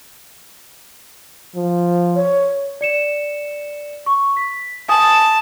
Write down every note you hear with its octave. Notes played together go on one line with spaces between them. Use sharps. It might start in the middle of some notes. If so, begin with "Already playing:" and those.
F3
C#5
D5 C#7 E7
C#6
B6
G#5 A5 D#6